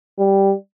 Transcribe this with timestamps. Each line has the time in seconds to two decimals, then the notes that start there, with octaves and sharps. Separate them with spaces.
0.19 G3